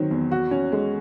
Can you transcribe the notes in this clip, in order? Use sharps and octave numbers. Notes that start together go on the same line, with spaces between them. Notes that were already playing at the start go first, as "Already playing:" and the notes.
Already playing: D#3 F#3 C4
E2
F#4
C#4
G#3